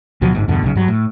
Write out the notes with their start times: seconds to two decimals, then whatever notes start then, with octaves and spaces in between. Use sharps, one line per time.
0.22 D2 B2 F3 F#3
0.35 G1 G#2
0.48 E2 G2 B2 D3
0.62 B1 C#3
0.75 G2 F#3
0.88 A2